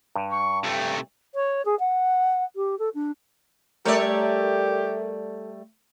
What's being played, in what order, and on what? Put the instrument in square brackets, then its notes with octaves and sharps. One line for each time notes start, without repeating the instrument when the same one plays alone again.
[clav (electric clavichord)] G2
[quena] C#6
[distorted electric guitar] C3 A3 [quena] G5
[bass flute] C#5
G#4
F#5
G4
A4
D4
[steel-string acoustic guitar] G3 A3 [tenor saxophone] G4 [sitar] A4 C#5 D5 [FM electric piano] A#4 E5